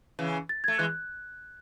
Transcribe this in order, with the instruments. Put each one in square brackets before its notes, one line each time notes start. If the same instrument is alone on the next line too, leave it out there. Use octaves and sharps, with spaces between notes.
[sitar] C#3 E3
[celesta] A6
[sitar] A3 [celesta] G#6
[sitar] E3 G#3 [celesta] F#6